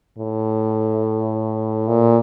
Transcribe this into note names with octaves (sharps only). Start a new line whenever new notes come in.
A2
A#2